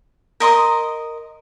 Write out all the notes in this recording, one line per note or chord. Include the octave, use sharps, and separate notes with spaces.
A#4 D#5 C6 D#6